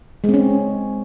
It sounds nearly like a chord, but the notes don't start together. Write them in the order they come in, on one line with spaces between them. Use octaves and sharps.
G#3 C4 C#4